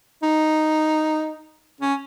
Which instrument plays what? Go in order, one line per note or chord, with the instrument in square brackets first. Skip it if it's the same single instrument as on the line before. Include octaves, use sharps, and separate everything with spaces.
[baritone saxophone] D#4
C#4